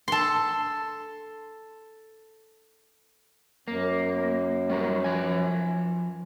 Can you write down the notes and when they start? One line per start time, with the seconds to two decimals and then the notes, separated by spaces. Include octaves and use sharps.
0.08 A4 C6
3.68 F#2 A#3
4.69 G3 C#4 A#4
5.04 F3 G#5